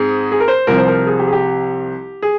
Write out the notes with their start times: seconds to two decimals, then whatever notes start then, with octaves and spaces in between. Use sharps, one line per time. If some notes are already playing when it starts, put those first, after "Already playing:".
Already playing: G#2 C4 G#4
0.32 G#4
0.40 A#4
0.48 C5
0.67 C2 C3 F3 A#4
0.78 C5
0.88 A#4
1.07 G#4
1.19 G4
1.28 G#4
1.33 G4
2.22 G#4